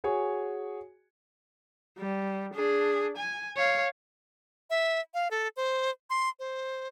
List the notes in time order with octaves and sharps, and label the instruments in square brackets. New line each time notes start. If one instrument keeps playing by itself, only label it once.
[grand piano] F#4 G#4 C#5 G#5
[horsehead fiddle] G3
D4 G#4
G#5
C#5 F5
[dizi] E5
F5
A4
C5
C6
C5